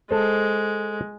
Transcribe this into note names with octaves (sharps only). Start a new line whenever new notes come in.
G#3 A4 C5